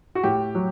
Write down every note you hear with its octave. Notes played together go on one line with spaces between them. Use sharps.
F#4
A2 G4
F#3